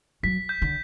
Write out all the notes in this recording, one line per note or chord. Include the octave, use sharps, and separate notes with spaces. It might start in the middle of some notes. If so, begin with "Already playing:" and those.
F#3 B6
G6
D3